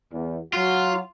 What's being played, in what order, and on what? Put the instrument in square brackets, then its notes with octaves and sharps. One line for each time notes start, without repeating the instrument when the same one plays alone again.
[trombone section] E2
[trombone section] F#3 F#4 [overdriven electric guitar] F4